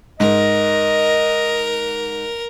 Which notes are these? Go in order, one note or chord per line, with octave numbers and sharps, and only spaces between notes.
G#2 A#4 D#5